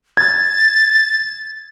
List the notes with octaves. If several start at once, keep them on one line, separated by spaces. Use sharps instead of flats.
G#6 A6